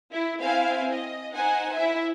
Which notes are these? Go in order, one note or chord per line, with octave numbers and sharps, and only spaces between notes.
E4
C4 E4 C5 F5 G#5
D#5
D#4 C5 F#5 G#5
E4 E5